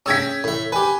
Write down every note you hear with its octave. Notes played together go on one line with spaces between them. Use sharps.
C#4 G#4 G5 E6 G#6 B6
A2 E5
G4 B4 G#5